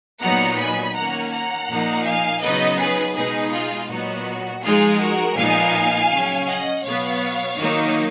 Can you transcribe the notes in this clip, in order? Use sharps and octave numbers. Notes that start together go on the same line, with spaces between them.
A#2 F#3 B3 D#4 F#5 A#5
G#5 B5
D#3 A#3 C#4 F#5 A#5
F#5 A#5
A#2 F3 A#3 D#4
F5 G#5
C#3 F#3 B3 D#4 B4 D#5
G#4 B4
B2 G#3 D#4 G#4 B4
F4 G#4
A#2 F#3 B3 D#4 F#4
F3 G#3 D#4 F4 G#4
F#4 A#4
A#2 F3 B3 D#4 F5 G#5
C#3 F#3 C#4
D#5 F#5
B2 F#3 B3 C#5 F5
D#3 F#3 A#3 D#4